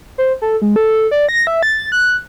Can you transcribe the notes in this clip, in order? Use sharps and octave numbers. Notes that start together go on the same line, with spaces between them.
C5
A4
G#3
A4
D5
A#6
E5
A6
F#6